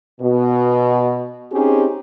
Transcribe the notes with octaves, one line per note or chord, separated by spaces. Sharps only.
B2
C4 C#4 D#4 G4 G#4